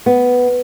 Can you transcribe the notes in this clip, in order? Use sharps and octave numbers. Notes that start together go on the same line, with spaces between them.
B3